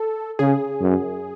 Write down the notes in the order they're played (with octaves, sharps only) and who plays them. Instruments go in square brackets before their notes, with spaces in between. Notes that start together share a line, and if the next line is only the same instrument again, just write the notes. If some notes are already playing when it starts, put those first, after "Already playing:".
Already playing: [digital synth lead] A4
[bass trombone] C#3 [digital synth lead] G#4
[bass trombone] F#2